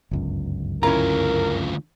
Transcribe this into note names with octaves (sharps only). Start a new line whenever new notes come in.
G1 C#2 F#2
D2 C#4 E4 F4 A#4 A#5